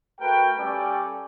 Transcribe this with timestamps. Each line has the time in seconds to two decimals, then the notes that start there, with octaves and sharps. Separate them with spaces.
0.20 A3 F#4 A#4 B4 G5
0.58 G3 C#4 A4 D5 G5 G#5